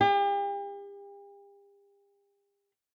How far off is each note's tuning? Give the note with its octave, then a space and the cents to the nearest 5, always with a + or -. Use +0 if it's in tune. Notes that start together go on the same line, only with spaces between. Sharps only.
G4 +40